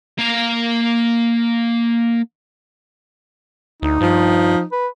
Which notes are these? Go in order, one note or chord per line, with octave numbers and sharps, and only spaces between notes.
A#3 F5
D2 D#4
G2 F3
B4